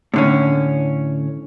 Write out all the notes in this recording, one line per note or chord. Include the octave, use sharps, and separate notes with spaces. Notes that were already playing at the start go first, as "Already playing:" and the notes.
A2 D3 C#4